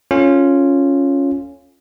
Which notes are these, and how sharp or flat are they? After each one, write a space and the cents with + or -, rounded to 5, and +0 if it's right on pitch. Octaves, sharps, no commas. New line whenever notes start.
C#4 +0 F4 +0 A4 +0